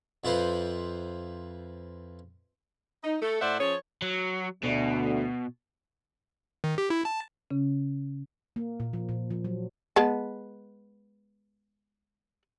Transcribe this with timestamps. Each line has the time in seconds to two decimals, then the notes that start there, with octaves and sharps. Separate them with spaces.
0.24 F2 E4 F4 B4 C5
3.04 D#4
3.21 A3 A4
3.41 A2 A3 C5 D5 E5 F#5
3.59 F3 C#4 G#4 C#5
4.02 F#3
4.63 D2 B2
6.64 D#3
6.78 G4
6.90 E4
7.05 A5
7.50 C#3 C#4
8.56 A#3
8.80 A#2
8.93 F3
9.09 A#2
9.31 F3
9.44 F#3
9.96 G#3 B3 A5